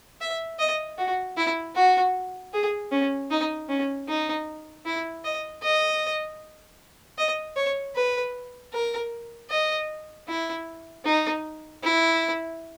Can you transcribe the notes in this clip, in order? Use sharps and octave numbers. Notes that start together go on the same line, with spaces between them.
E5
D#5
F#4
E4
F#4
G#4
C#4
D#4
C#4
D#4
E4
D#5
D#5
D#5
C#5
B4
A#4
D#5
E4
D#4
E4